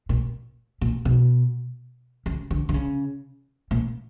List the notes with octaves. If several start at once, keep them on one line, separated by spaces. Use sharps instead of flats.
A#2
A#2
B2
C#3
D3
D3
C#3
A#2